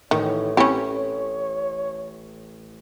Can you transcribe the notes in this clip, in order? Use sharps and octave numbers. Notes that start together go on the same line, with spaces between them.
A1 A2 D#3 C#5
C4 C#4 E4 G4